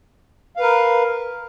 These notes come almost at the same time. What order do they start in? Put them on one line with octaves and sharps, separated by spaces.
F5 B4 A#4